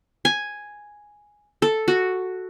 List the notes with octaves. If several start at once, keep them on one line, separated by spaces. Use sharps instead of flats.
G#5
A4
F#4